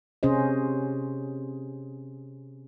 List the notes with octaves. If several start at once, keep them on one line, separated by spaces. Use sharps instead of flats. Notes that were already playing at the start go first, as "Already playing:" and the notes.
C3 C#4 G#4 C5 D#5